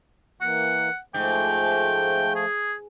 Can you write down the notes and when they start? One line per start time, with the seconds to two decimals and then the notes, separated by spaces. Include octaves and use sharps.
0.41 E3 A#3 F#5
1.14 G#2 F3 A3 G5
2.35 G#4